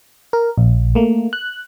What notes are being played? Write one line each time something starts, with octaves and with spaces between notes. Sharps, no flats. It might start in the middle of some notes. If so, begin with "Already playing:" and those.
A#4
A#1
A3 A#3
F#6